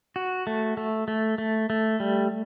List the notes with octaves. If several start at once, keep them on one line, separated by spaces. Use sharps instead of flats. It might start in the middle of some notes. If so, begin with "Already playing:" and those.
F#4
A3
A3
A3
A3
A3
G3